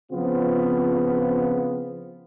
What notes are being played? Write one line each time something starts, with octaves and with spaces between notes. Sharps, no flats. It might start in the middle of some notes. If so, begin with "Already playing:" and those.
C#3 F3 B3 C4 F4